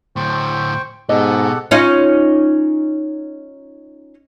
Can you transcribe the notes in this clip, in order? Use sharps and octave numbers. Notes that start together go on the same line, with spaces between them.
D2 A2 C5 G5 C#6
G#2 B2 G4 A4 D#5 F#5
C#4 D#4 F4